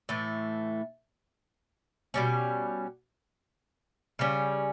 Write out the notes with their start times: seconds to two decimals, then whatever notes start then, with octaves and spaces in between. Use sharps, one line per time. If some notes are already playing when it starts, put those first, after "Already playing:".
0.09 A2 E3 A3
2.14 B2 G3 C#4
4.19 C#3 G3 C#4